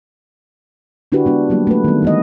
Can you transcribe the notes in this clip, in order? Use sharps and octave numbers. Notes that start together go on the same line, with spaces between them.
D3 D4 E4 F#4 G4 B4
G#3 B3 D4
F#3 G3 A#3 G4
A3 A#3 B4
D#3 G3 B3
E3 G#3 D#5